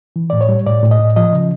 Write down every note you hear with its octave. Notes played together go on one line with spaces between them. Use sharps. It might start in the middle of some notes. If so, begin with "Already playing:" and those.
E3
A2 D5
C#5
G3
A2 D5
A2
D#5
A2
F3 D#5
C#3